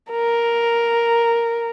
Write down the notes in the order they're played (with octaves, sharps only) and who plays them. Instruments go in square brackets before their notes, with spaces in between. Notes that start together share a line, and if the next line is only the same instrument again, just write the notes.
[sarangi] A#4